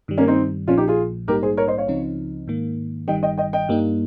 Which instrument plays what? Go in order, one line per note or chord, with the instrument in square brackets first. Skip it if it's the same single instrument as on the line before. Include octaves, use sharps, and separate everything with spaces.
[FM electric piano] G2 D#3 G3
[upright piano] A#3 C#4
C4 D#4
[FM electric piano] A#1 A#2 F3 [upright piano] C#4 F4
[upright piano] D#4 G4
F4 G#4
[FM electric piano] A#1 G#2 G3 A#3 D#4 [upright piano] G4 A#4
[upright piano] G#4 C5
A#4 C#5
C5 D#5
C#5 F5
[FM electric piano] C#2 C#3 F3 C4 D#4
G#2 D#3 A#3
[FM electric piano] G1 G2 D#3 G3 [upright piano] D#5 G5
[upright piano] D#5 G5
D#5 G5
D#5 G5
[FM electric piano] G2 G3 A#3 D#4